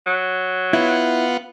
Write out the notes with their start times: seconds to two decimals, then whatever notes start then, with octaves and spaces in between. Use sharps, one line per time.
0.06 F#3
0.73 B3 E4 F4 F#5